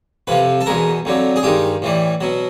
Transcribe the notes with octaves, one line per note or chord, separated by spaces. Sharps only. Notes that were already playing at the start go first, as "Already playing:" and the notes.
F2 C3 F3 B4
A4
E2 B2 G#3 A#4
F2 D3 F#3
G#4
G2 D#3 G#3 G4
A2 E3 G3
B2 F#3